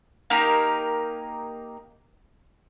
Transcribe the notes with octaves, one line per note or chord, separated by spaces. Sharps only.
A#3 D#4 G4 A#4